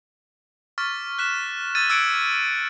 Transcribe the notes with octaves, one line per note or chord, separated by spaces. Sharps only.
C#6 D6 F6 A6 B6
F#6 B6 E7
E6 F6 G#6 A6 D#7
D6 E6 F#6 G#6 C#7 D7